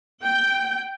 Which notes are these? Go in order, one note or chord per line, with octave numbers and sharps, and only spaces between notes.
G5